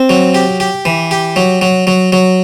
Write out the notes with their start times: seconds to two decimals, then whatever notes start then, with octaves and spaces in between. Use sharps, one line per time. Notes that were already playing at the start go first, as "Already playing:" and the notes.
Already playing: C4
0.09 F#3
0.35 G4
0.60 G4
0.85 E3
1.11 G4
1.36 F#3
1.62 F#3
1.87 F#3
2.12 F#3